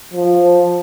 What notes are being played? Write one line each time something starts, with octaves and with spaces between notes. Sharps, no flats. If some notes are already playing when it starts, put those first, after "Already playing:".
F3